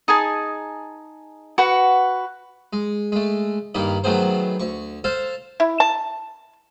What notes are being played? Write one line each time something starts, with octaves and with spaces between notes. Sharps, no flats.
D#4 G#4 G#5 A5
F#4 B4 F#5
G#3
G#3 A3
G2 D#3 A#3 D#4 B5
D#3 F#3 A3 B3 G#4 C5
D2 C#6
A4 C5 F5 A5
E4
A5